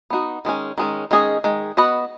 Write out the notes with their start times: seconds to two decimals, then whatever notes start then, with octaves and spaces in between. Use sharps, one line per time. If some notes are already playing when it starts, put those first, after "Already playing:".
0.10 B3 D#4 F#4
0.45 D#3 G#3 C#4
0.78 D#3 G#3 C#4
1.11 D#3 G#3 C#4 G#4 D#5
1.44 D#3 G#3
1.77 B3 F#4 B4 D#5